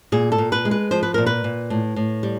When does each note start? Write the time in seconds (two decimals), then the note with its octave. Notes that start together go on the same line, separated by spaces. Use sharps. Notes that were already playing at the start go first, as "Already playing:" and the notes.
0.12 A#2 G#4
0.32 A4
0.38 A#2
0.52 B4
0.65 G#3
0.71 B4
0.91 F3 C5
1.03 B4
1.14 A#2 A#4
1.27 B4
1.44 A#2
1.70 A2
1.96 A2
2.23 G3